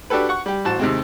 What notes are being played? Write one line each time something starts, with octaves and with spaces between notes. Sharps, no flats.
D4 F#4 G4 A4 B4
F#5 C#6
G3 G4
A1 F#4 C5 A5
D#2 C3 G#3 C4